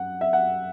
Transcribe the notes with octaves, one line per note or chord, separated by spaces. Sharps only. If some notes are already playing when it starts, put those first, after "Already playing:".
Already playing: F#2 F#5
E5
F#5